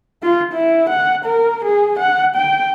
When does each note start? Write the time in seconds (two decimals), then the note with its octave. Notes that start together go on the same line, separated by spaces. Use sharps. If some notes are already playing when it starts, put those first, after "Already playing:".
0.23 F4
0.53 E4
0.89 F#5
1.25 A#4
1.65 G#4
1.99 F#5
2.35 G5